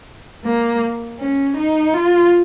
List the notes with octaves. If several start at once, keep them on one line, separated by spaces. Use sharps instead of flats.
A#3
C#4
D#4
F4